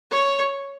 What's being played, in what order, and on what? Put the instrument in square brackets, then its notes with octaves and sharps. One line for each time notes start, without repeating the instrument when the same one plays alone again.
[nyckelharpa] C#5